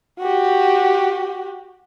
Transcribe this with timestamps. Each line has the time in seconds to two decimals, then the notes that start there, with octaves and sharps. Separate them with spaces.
0.19 F#4 G4